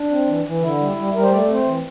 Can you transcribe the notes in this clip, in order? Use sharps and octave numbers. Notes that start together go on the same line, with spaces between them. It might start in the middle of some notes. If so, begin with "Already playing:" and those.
Already playing: D4
C4
E3
E3
D3 E4
G3
G3
G3 A#4
C5
A3 D5
C4
C5
E3